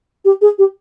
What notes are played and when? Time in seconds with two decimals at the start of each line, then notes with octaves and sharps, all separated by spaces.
0.25 G4
0.42 G#4
0.59 G4